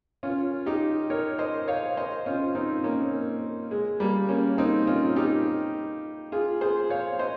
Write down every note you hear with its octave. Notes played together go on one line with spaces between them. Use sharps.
C#4 F4
D#4 G4
A#4 C#5
C5 D#5
C#5 F5
C5 D#5
C#4 F4
C4 D#4
A#3 C#4
G#3
G3 A#3
A#3 C#4
C4 D#4
C#4 F4
D#4 G4
F4 G#4
G#4 C5
C#5 F5
C5 D#5